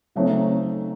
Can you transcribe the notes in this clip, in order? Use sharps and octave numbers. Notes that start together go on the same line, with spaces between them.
C#3 F#3 A3 C4 D#4